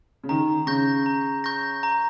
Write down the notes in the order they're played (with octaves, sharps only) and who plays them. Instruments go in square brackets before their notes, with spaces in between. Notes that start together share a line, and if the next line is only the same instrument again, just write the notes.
[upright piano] C#3
[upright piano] D#3 [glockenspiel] A#5
[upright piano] C#3 [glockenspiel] C#6 G6 A#6
[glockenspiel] A#5
C#6 G6 A#6
A#5